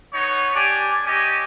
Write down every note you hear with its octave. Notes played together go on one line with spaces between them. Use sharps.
B3 D#4 C#5
D4 G4 D5 G#5
C#4 G4 D5 D#5 G#5